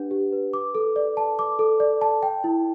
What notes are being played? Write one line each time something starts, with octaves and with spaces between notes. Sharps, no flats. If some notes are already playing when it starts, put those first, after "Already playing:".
Already playing: D4 G4 B4 F#5
G4
B4
D6
A4
D5
A5
D6
A4
D5
A5
G5
E4